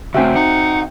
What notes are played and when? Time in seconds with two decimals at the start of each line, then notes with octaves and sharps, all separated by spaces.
0.14 C#3 A3 C4 F#4 E5 G5 G#5
0.36 D#4 F#5